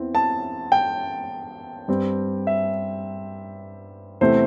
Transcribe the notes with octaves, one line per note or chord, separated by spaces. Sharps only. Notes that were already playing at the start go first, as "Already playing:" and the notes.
Already playing: E2 E3 C4
A5
G5
G2 G3 C4
E5
E2 C3 E3 A3 C4 C5